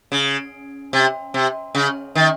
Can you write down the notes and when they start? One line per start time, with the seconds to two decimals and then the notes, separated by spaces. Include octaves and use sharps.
0.12 C#3
0.93 C3
1.34 C3
1.75 C#3
2.15 D#3